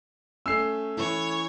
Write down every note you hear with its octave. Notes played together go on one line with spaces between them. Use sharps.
A3 C#4 E6 C7
E3 E4 C#5 C#6